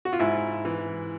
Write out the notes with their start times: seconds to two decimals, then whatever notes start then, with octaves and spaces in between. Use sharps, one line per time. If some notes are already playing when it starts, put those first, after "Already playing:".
0.05 F#4
0.13 F4
0.19 G#2 E4
0.65 E3